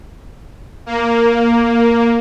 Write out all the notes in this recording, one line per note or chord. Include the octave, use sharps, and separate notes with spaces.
A#3